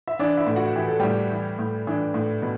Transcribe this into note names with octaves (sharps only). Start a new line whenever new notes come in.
E5
E3 D4 D5
E4 E5
A2
F#4 F#5
E3 G4
A4
A2 G3 G4
E3
A2
E3 D4
A2
B2